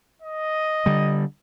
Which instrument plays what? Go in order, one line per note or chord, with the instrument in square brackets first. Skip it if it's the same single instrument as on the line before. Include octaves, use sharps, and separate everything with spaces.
[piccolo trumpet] D#5
[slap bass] D3 G3